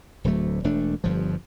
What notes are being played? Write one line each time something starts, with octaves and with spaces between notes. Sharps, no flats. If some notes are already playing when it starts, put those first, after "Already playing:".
D1 D2 F#3 A3
E1 A3 D4
G1 G2 F3